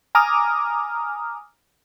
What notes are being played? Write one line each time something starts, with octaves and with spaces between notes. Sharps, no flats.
G#5 A#5 D6 D#6 F6